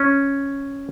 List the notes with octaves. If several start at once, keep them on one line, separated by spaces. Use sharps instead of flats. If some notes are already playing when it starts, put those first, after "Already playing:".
Already playing: C#4